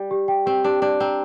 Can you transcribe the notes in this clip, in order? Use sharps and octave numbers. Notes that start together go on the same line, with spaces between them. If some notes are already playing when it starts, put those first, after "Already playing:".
Already playing: G3
G4
G5
C4 G4
D4 G4
D4 D5
C4 A#5